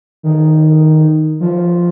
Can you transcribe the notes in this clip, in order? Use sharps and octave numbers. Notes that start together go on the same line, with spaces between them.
D#3
F3